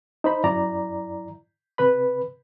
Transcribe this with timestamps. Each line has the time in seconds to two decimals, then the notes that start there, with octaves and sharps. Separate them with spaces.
0.24 D#4 C5 B5
0.44 F#2 E4 D5 A#5
1.78 C3 B4 B5